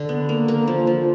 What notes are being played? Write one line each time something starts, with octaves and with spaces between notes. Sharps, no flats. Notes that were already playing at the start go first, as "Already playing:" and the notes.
Already playing: D3
B3
A#3
A#3
F3
F3